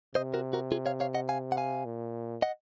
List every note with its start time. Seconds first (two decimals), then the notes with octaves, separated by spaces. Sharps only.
0.15 C3 C5 D#5
0.34 F#4 A#4
0.53 F#4 A#4
0.72 F4 G#4
0.86 C#5 F5
1.00 C#5 F5
1.14 D#5 F#5
1.29 F5 G#5
1.52 F#5
1.57 F5 G#5
1.85 A#2
2.42 D#5 F#5